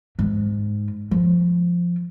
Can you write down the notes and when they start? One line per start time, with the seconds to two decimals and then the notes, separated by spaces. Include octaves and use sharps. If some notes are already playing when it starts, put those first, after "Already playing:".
0.19 G#2
1.11 F3